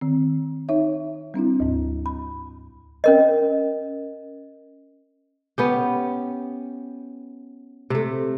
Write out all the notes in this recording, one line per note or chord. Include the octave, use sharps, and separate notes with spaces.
D#3 C4
D#4 C#5 E5
G3 C4 D4 E4
D2 G#2
B5
C#4 A#4 D#5
B3 C#4 G4
C3 A3